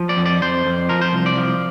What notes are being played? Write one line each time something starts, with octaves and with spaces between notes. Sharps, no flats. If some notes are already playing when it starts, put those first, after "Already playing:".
Already playing: F3
D5
F2
D5
F2 C5
F2
F3 A#4
C5
C2
D5
F3